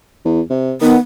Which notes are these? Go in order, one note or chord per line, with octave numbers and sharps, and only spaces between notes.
E2
C3
D#3 B3